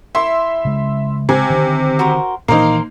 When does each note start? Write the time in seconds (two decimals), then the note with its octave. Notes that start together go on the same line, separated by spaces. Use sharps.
0.15 E4 E5 C6
0.65 C#3 G#3
1.29 C3 G#5
1.50 D3 D#3 C4
1.99 F#4 A#4 C5
2.48 A#2 D#3 E3 A#3 D#4 A#4 C5